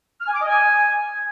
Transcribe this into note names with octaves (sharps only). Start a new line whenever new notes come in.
F6
G#5
D6
D#5
G#5